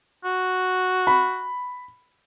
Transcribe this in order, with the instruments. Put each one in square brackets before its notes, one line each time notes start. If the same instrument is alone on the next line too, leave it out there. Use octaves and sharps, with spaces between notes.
[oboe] F#4
[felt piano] B5